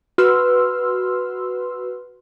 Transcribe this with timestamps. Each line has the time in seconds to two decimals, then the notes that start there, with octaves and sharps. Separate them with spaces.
0.18 F#4 B4 C6 E6 F6